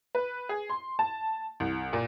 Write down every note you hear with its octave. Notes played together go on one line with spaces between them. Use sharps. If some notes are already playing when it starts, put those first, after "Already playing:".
B4
G#4
C6
A5
C2
A#2